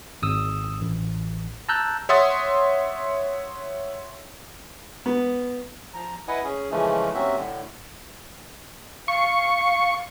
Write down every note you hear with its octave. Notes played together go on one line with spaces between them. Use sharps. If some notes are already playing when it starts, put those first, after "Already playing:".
G#1 D#6 E6
A1
A5 A#5 E6 F#6 G6
C#5 E5 F#5 C6 D#6 A6
B3
F3 A#5
E4 B4 D#5 F#5 G#5 D#6
C#4 G#4
C#3 E3 F3 G#3 A3 C#4
D#2 F#3 C4 C#4 F#4 E5
A2 D3
F5 C#6